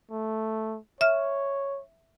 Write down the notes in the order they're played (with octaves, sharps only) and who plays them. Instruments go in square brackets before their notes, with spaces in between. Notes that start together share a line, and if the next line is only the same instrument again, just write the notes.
[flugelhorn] A3
[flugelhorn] C#5 [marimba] E5 F6